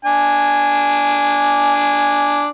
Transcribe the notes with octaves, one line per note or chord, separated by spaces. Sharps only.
D4 G#5